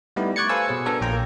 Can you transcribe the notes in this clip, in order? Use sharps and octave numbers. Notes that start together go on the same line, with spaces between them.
G3 A3 B3 D#4 E4 G4
C#6 D6 F#6 G#6 A6 C#7
A4 B4 C5 F5 G#5 E6
B2 G#4 C#5
B3 D4 F#4 A4 A#4 C#5
A#1 A#3 F4 G5 A#5